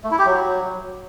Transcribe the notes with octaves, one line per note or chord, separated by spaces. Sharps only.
A3
E4
G4
F#3